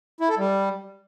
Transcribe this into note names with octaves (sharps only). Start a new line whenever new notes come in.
E4
A4
G3